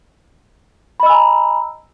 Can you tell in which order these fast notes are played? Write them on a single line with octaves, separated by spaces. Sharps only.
B5 D#5 E6 G#5 A#5